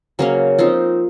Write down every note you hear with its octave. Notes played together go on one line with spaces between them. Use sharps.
C#3 F#3 A#3 C#4
F3 C4 D#4 F4